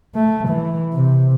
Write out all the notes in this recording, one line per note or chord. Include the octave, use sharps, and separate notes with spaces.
A3
E3
C3